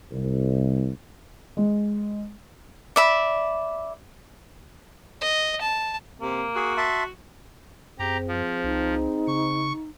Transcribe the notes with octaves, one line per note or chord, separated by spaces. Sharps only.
C2
G#3
D5 E5 B5
D#5
A5
C3 A#3
F#4 G#4
E5 A5 C6
F#2 C4 G4 G#4 A#5
F3
C2 D#4
C#3 C#6